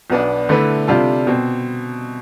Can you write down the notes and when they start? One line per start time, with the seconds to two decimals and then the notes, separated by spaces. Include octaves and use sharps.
0.10 B1 B2 B3 D4
0.49 D3 A3 E4 B4
0.88 C3 G3 D4 F4 A4
1.27 B2 C4